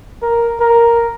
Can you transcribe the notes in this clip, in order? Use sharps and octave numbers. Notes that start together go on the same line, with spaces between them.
A#4
A#4